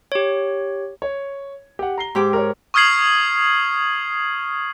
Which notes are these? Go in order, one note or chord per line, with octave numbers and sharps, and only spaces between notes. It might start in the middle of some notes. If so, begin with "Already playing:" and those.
G4 C#5
C#5
G4 F#5
A#5 C7 G7
G#2 G4 D6
A#4 C#5
C#6 D#6 F6 G#6 C7 F#7